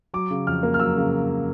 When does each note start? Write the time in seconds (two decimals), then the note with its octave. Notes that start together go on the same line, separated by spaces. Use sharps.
0.14 F#3 D6
0.30 C#3
0.47 F2 F6
0.63 A#3
0.74 F6
0.79 F#3 E6
0.97 C#3